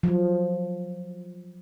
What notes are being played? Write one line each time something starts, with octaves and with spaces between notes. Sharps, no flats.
F3 F#3